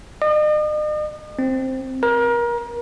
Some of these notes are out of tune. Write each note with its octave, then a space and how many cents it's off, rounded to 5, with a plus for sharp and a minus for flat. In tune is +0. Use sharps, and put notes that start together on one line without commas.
D#5 -45
C4 +5
A#4 +30